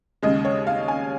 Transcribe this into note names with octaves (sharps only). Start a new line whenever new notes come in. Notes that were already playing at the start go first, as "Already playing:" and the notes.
D#2 C#3 G#3 D#5
C#5
F5
G#5